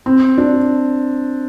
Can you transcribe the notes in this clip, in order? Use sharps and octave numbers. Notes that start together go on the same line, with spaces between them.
C4
D4